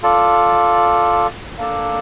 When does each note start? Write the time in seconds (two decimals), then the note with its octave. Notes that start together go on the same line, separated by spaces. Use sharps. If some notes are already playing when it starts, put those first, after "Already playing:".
0.03 F4 A4 D5
1.58 A#3 D4 A4 D5